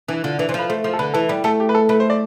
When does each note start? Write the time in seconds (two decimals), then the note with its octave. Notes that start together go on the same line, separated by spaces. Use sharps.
0.08 E3 D4
0.24 D3 F4
0.39 E3 D4
0.49 E3 C5
0.54 F3 B4
0.69 A3 C5
0.84 F3 C5
0.94 A4
0.99 D3 B4
1.14 E3 A4
1.29 G3 B4
1.44 A3 A4
1.60 G4
1.69 B4
1.75 A4
1.89 A3 B4
2.00 C5
2.10 D5